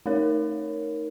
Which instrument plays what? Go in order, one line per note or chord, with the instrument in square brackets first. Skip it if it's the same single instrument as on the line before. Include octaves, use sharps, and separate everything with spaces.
[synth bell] A3 D#4 A#4 C#5